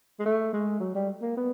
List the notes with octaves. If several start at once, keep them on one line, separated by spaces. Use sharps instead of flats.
G#3
A3
G#3
F#3
G3
A#3
B3